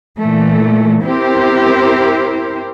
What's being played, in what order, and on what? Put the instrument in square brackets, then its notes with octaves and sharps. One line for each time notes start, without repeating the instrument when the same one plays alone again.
[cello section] A#2 E3 A3
C4 E4 G4 A#4 C5